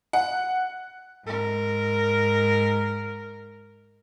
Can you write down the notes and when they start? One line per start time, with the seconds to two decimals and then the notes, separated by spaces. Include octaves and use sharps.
0.13 F#5
1.25 G#2 A#4